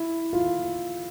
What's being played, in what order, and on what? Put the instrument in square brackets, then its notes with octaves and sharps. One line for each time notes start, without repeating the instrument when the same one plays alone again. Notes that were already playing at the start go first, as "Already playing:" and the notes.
Already playing: [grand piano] E4
F4